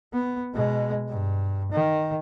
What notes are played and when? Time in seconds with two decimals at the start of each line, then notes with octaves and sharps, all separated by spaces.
0.13 B3
0.54 B2 G#3
1.09 G2
1.72 D#3